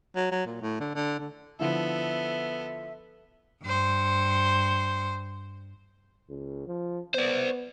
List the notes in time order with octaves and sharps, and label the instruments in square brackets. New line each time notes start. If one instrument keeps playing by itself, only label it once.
[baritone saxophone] F#3
F#3
A#2
A2
D3
D3
D3
[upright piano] D3 F3 E4 [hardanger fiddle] B3 A4 [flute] E5
[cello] G2 C5
[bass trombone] C#2
F3
[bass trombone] B3 [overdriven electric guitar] C5 D5